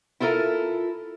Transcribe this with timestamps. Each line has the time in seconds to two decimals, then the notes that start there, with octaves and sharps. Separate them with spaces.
0.20 E4 F4 A4 A#4 E5